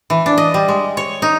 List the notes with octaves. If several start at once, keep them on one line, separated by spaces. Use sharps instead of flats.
E3
D4
D#5
G3
G#3
C#5
D#4